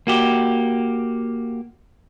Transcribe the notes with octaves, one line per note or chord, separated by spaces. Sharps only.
A#3 F#4 G4